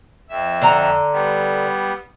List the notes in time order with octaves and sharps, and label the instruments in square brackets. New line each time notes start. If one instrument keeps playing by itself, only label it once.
[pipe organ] F2 E5
[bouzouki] D3 A#5
[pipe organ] G3 B3